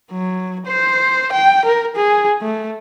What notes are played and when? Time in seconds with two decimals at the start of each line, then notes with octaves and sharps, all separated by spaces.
0.12 F#3
0.66 C5
1.32 G5
1.65 A#4
1.96 G#4
2.42 A3